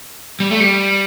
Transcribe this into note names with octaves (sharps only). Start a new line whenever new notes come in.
G3
A3
G3